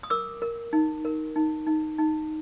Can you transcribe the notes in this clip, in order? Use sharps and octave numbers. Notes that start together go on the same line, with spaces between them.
D#6
A#4 D6 E6
A#4
D#4
A#4
D#4
D#4
D#4